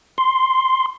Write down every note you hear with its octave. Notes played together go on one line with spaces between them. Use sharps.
C6